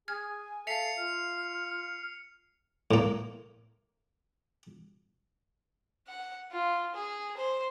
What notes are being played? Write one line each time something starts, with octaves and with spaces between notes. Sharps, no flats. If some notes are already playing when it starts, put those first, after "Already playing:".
G#4 G#5 F6 G#6
A4 E5 F5 C7 C#7 F7
F4 F6
A2 A#3
F#5
F4
G#4
C5